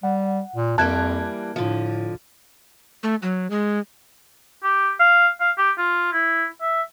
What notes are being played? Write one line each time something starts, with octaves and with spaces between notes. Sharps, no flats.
G3 F#5
A#2
F2 E3 G3 A#3 A5 F#6 G#6
A2 D3 F3
A3
F#3
G#3
G4
F5
F5
G4
F4
E4
E5